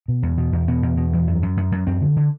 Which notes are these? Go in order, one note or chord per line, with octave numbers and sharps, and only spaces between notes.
B2
E2
B2
E2
B2 B3
E2
B2
E2
F#2
F#2
F#2
F#2
F#2 C4
D3
D3